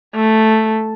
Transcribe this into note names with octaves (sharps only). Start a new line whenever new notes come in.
A3